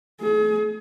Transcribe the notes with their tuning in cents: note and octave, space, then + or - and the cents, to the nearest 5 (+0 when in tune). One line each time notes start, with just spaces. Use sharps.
A3 +0 G#4 +40